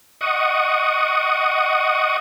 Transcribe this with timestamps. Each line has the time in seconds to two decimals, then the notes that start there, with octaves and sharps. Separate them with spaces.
0.21 D#5 F#5 C#6 D#6